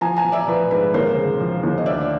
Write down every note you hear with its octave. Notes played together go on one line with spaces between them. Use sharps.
F3 G#5 A#5
G#5 A#5
F3
D5 E5
F3 B4
G#2 B4
D#2 A#4 C5
C#3
F3
D#2
D#5
D2 D5 E5